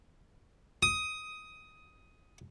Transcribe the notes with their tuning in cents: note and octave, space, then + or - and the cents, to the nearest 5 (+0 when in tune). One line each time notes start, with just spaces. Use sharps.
D#6 +10